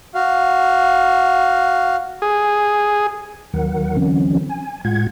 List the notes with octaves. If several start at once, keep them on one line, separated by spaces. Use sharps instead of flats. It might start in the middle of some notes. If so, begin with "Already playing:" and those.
F#4 F5
G#4
D#2 D#3 F#3 A#4 F#5
D3 E3 F#3 C4 C#4
G#5
A2 G#3 F4 F#5 G#6